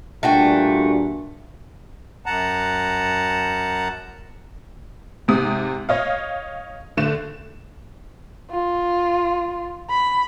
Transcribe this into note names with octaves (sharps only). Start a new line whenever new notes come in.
A#2 G3 A3 D4 F#4 G5
F#2 F#5 A5 A#5
G#2 C3 D#6
C#5 D#5 F5
D3 A3 E7
F4
B5